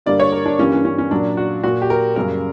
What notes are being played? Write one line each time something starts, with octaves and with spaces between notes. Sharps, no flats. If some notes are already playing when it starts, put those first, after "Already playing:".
G2 D3 G3 A#3 D5
C#5
A#4
D4
G2 E3 G3 A#3 C#4
C#4
C#4
C#4
A#2 F#3 A#3 D4
F#4
A#2 A#3 F#4
G4
A#4
F#2 C#3 G3 A#3 A#4